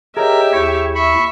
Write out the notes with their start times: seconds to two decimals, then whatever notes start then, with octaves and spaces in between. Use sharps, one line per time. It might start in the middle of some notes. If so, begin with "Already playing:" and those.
0.17 G4 G#4 A#4 C#5 D#5 E5
0.53 D#2 E4 C#5
0.95 E5 B5 C#6